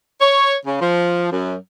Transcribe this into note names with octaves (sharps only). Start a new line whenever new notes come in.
C#5
C#3
F3
F#2